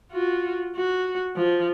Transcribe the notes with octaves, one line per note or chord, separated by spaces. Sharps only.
F4 F#4
F#4
F3